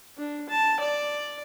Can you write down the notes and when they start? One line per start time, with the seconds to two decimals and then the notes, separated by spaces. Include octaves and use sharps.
0.18 D4
0.49 A5
0.80 D5